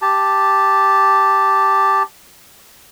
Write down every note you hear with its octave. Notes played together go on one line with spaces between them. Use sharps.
G4 A5